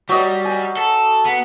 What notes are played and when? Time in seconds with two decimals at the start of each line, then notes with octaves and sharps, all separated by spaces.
0.09 F#3 G3 D#5
0.45 G#5
0.77 A4
1.25 B3